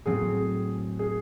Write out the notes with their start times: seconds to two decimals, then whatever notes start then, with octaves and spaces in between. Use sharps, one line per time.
0.06 A2 F#3 C4 G#4
0.99 G#4